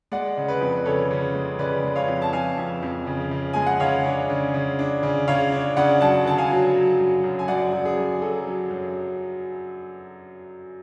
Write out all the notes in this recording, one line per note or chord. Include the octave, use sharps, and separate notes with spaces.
G#3 D5 F#5
C#3
B4 D5
F2
B4
C#3 A4 C#5
C#3
G#3
C#3 B4 D5
G#3
C#5 F5
F2
A5
F2 F5 G#5
F2
F2
C#3
C#3
G#3 G#5
F#5
C#3 C#5 F5
D4
C#3
C#3
D4
C#3
C#3 C#5 F5
D4
C#3 D5 F#5
F#2 F#5 A5
D3 A5
F5 G#5
F#3
F#3
F#2
F#2
G#5
F#2 D5 F#5
F#2
G#4
F#2
F#3 A4
F#3
F#2